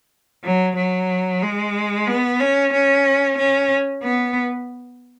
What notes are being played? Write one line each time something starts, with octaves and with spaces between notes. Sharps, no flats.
F#3
F#3
G#3
B3
C#4
C#4
C#4
B3